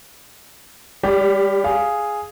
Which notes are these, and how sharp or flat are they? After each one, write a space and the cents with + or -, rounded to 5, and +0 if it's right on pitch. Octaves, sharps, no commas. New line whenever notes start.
G3 +30 G4 +0 D5 -35
G#4 +0 F5 +0